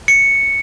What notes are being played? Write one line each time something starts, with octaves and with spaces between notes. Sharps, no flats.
C#7